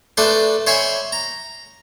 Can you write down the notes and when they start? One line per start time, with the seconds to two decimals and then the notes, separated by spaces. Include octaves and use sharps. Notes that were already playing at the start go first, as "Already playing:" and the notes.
0.17 A3 D4 A4 B4 C5
0.67 C5 C#5 E5 G#5 B5 C6
1.12 A#5